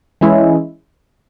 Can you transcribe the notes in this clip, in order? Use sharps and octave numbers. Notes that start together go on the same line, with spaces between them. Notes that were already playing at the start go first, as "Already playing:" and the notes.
E3 G#3 C#4 E4